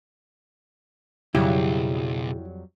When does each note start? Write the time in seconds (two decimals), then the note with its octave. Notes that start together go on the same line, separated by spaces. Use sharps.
1.35 B1 F2 C#3 F#3 G3 E4 G4